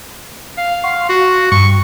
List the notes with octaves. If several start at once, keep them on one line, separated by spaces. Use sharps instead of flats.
F5
F#5 C6 C#6
F#4
G2 C#6